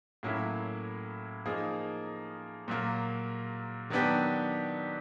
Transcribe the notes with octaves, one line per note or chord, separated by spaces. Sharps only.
A2 F#3 A#3 C#4 E4
F3 A#3 D#4 G#4
A#2 F#3 A#3
D#3 F#3 B3 D4 G4